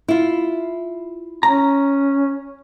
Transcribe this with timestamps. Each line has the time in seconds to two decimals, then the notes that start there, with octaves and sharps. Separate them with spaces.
0.08 E4 F4
1.43 C#4 A#5